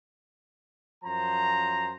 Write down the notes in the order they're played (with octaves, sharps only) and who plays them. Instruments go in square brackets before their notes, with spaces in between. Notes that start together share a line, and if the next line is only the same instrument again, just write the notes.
[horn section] F#2 F3 C5 A#5